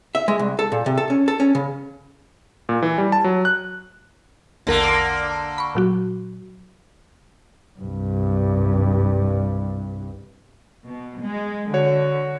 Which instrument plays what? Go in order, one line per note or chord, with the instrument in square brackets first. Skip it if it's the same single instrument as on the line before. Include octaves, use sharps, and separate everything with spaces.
[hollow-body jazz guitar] E5
G#3
C2
A4
A#2
C3
A4
C#4
A4
C#4
C#3
[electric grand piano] A#2
E3
G3
A5
F#3
F#6
[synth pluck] A#1 E2 A#4 [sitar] D3 A#3
[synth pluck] B5 C#6
A#2 F#3 F#4
[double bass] C2 G2
[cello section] B2
G#3
[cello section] D3 [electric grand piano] F#4 C#5